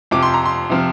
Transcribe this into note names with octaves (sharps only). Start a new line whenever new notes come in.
F2 C3 F3 D6
C6
A#5
C6
C3 F3